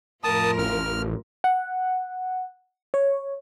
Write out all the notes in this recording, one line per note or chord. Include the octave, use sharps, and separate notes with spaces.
F2 A2 F3 A#4 A5 D#6
A1 F6
F#5
C#5